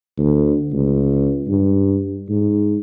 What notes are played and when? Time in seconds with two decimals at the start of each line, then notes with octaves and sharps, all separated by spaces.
0.18 D2
0.72 C#2
1.48 G2
2.29 G#2